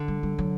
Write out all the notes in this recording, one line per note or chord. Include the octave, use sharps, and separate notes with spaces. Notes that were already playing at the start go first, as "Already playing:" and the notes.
Already playing: D3
G3
G3
F#3